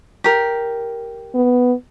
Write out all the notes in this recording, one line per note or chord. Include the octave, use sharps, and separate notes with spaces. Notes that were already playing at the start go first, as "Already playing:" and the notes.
G4 A#4
B3